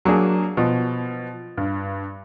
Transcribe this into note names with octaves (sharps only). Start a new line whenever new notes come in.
F#3 A#3 D4 G#4
B2 F3
G2